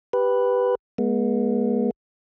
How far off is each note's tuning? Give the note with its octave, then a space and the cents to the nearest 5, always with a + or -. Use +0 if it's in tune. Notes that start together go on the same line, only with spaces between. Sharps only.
G4 +0 B4 +0
G#3 +5 B3 -40